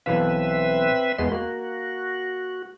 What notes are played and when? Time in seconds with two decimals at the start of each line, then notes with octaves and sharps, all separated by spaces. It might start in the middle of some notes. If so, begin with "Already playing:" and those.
0.06 B1 E3 C4 B4 E5 F5
1.19 E2 G#3 B3 D#5 C6
1.32 A#3 F#4